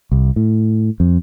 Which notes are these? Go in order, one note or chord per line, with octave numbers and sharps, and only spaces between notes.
C2
A2
F2